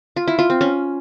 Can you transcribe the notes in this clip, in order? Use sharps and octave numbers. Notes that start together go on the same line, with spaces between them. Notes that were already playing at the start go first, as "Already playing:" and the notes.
F4
E4
F4
C4
C#4